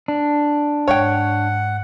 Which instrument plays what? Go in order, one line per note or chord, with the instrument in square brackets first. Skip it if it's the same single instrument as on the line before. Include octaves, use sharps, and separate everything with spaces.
[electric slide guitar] D4
[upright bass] G#2 [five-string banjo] C#5 G5 [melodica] F#5